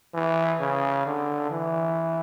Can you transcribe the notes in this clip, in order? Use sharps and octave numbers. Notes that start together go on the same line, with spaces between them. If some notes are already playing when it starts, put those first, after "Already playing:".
E3
C#3
D3
E3